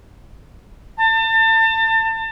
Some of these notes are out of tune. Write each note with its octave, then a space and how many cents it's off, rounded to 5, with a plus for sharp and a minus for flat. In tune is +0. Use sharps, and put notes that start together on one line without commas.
A5 +30